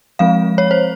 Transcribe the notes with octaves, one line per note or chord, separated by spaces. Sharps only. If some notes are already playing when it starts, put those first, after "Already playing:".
F3 G#3 C4 F5
C#5
C5